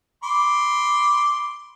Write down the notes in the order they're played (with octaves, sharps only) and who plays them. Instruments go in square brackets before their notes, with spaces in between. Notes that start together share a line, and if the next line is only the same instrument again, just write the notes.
[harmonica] B5 C6 D6